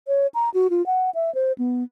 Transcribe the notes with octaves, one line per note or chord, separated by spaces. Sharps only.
C#5
A#5
F#4
F4
F#5
E5
C5
B3